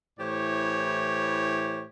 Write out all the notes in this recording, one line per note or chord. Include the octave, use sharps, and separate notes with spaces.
A2 E3 G4 C5 C#5